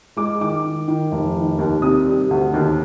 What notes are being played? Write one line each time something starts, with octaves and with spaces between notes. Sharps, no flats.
G#3 D6
D#3 D6
D#3
D#3
F1
D#3
D#2
C3 D#6
G3
D2
D#2